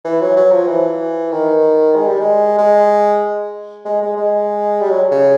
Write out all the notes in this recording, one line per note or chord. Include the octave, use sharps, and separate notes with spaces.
E3
F#3
F#3
F3
E3
D#3
G#3
G3
G#3
G#3
G#3
G#3
G#3
G3
F#3
C#3